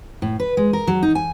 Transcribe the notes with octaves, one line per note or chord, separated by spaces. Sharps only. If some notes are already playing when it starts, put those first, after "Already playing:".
A2
B4
G#3
A#4
F#3
D#4
G#5